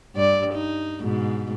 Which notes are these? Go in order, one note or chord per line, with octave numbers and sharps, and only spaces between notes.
G2 D5
D#4
G#2 B2